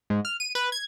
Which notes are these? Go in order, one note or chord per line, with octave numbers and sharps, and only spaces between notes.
G#2
F6
D#7
B4
G#6